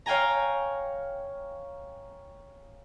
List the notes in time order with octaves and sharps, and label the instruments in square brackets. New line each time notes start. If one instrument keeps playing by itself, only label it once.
[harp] C#5 F5 G5 G#5 A#5